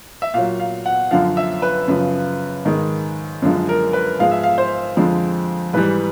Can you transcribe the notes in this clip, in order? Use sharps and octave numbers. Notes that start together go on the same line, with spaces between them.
E5
A#2 F#3 F5
F5
F#5
F#2 D3 F3 F5
E5
B4
F#2 C#3 F3
G#2 D#3 G#3
F#2 D3 F3 G#3
A#4
B4
G#2 F3 G#3 F5
E5
F5
C5
F2 D3 F3 G#3
G#2 E3 G3 B4